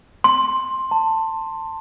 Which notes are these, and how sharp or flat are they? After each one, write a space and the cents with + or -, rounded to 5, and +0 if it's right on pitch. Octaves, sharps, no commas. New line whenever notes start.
C6 +10
A5 +20